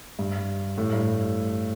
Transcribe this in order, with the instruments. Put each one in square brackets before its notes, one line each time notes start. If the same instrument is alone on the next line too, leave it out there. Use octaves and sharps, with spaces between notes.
[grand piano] G2
A2
G2